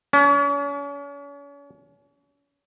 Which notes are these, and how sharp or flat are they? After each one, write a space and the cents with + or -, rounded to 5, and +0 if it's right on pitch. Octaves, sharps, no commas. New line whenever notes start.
C#4 +40